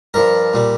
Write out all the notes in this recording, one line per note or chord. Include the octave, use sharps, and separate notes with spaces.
G2 F3 A#4
A#2 G3